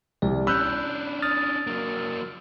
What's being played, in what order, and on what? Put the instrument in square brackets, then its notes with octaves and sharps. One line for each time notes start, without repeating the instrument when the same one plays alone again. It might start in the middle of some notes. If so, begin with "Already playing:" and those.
[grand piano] C2 [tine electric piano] D5
[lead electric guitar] C#4 D4 [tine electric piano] B5 F#6 G6 [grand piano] E6
[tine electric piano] D#6 F6 A6
[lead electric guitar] F#3 A#3